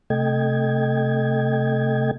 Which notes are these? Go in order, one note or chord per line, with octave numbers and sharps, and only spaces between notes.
C3 A3 A4 D#5 G5 G#6